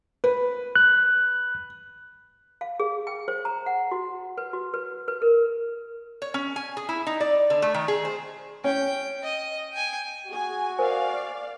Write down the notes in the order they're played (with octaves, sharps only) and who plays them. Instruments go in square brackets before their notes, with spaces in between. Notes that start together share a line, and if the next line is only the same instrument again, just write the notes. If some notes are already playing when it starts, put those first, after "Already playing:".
[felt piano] B4
[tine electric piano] F#6
[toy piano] F5
G#4
G5
C5
A#5
F#5
F#4
B4
F#4
B4
B4
A#4
[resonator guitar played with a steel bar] C#5
C#4
G#5
G#4
E4
D#4
D5
D3
A3
D#3
G#4
C5
[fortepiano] C#4 [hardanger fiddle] G5
[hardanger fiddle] D#5
G5 G#5
[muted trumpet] F#4 [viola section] G#4 G#5
[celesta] A#4 C5 G#5 [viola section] D5 F5